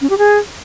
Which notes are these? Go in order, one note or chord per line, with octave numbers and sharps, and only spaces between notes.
C#4
G4
G#4